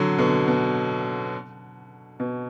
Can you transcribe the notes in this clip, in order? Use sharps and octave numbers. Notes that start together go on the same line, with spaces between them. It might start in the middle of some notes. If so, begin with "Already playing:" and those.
Already playing: D3 F#3
B2 D3
B2
B2